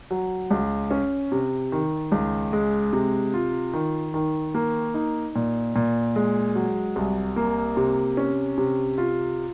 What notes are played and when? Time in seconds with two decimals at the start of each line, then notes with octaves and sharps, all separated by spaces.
0.11 F#3
0.51 C#2
0.91 C#4
1.32 C3
1.72 D#3
2.12 C#2
2.53 G#3
2.93 C3
3.34 F4
3.74 D#3
4.14 D#3
4.54 A#3
4.94 D#4
5.36 A#2
5.76 A#2
6.16 G#3
6.55 F#3
6.96 C2
7.36 A#3
7.77 C3
8.17 C#4
8.58 C3
8.98 F4